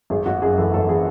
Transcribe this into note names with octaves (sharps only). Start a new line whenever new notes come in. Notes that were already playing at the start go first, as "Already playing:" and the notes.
G#1 G#4
G#1 F#4
F#2 G#4
E3 A4
G#1 A4
E3 G#4